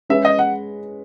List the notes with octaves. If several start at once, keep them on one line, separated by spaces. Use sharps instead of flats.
G#3 C#4 G#4 B4 E5
D#5
F#5